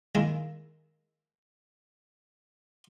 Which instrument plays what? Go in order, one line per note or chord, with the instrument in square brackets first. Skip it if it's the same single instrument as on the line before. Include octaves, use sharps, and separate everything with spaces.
[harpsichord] D#3 G#3 A#3 E4